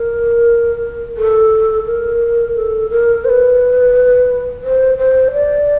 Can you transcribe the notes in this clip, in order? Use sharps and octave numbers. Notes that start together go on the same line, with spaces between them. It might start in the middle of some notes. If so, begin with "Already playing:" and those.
Already playing: A#4
A4
A#4
A4
A#4
C5
B4
C5
C5
D5